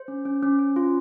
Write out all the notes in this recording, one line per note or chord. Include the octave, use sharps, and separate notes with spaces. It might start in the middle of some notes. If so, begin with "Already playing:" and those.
Already playing: C5
C#4
C#4
C#4
C#4
F4